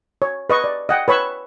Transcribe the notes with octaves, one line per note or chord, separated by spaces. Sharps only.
C#5
B4 D#5 C#6
D5
D#5 F#5 G5
B4 C#5 B5 C#6 E6